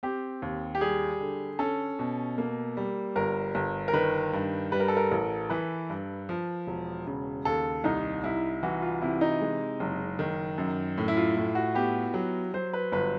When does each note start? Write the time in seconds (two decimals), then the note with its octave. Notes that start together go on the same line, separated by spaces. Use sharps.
0.03 C4 G4
0.42 D#2
0.75 G4
0.81 G3 G#4
1.20 D3
1.59 C#4 A4
1.99 B2
2.38 A#3
2.77 G3
3.16 G1 A#4
3.55 G1
3.88 A#4
3.93 D#3 B4
4.33 G2
4.72 G3 B4
4.80 A#4
4.88 A4
4.97 A#4
5.11 A1
5.50 E3 B4
5.90 G2
6.29 F3
6.67 E1
7.07 C#3
7.45 D#2 A4
7.84 C2 D#4
8.24 C2 E4
8.63 E3 F#4
8.82 F4
9.02 C3 E4
9.21 D#4
9.41 G#3
9.80 F#1
10.19 D#3
10.58 F#2
10.98 A2
11.08 E4
11.17 F4
11.37 A2
11.55 F#4
11.75 B3 G4
12.14 F#3
12.54 F#3 C5
12.73 B4
12.92 G1 B4